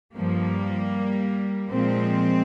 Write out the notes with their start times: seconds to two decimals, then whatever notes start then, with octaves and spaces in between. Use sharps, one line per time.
0.14 G2 F3 G3 A#3
1.71 A#2 F3 G#3 C4